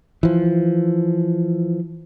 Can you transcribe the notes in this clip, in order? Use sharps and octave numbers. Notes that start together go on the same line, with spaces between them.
E3 F3